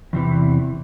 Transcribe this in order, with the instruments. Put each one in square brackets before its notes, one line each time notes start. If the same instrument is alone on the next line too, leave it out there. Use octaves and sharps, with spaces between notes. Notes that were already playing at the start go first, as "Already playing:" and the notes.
[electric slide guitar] E2 C3 E3